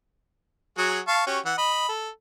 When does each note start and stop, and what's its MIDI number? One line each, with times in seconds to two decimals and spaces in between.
0.78 1.00 54
0.78 1.00 66
0.78 1.00 68
1.07 1.22 77
1.07 1.22 81
1.07 1.22 85
1.26 1.39 61
1.26 1.39 66
1.26 1.39 67
1.45 1.53 52
1.45 1.53 78
1.58 1.87 75
1.58 1.87 83
1.89 2.10 69